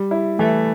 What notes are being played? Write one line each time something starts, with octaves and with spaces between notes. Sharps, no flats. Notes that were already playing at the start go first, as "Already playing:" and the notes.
Already playing: G3
E4
E3 A3